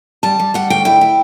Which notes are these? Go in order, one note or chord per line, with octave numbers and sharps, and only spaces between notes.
G3 A5
G3
G3 F#5
D2 G5
E4 G5
E4